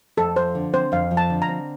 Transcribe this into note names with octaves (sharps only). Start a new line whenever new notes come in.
F2 A4
F3 C5
D3
C4 C5
F2 F5
F3
A5
D3
A#5
C4